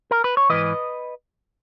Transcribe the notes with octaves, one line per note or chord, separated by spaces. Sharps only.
A#4
B4
C#5
G#2 E3 B4 D#5